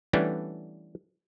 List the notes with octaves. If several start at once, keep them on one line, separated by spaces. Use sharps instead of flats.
E3 G3 A3 B3 C#4 D4